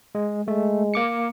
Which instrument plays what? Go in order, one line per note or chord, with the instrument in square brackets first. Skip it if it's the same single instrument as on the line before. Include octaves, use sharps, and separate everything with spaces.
[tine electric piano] G#3
[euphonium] G#3 [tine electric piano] A3
[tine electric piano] A#3 D6 C#7